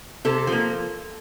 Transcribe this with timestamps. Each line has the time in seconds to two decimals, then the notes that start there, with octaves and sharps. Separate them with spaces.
0.25 C3 A4
0.47 F3
0.52 A#3